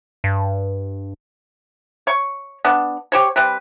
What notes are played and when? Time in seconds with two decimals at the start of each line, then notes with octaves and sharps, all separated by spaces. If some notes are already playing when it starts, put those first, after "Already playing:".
0.24 G2
2.07 C#5 C#6
2.65 B3 D4
3.12 G4 C5 C#5
3.36 G3 C4 B4